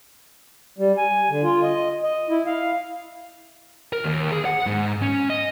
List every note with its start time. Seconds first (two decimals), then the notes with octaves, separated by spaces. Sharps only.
0.79 G3
0.98 G#5
1.30 D3
1.43 F4
1.63 D#5
2.03 D#5
2.30 E4
2.46 F5
3.93 A#4
4.04 D#2
4.32 G#4
4.45 F#5
4.66 G#2
5.02 C#4
5.30 D#5